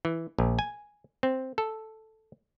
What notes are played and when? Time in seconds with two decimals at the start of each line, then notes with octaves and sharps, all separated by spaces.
0.05 E3
0.39 A#1
0.59 G#5
1.23 C4
1.58 A4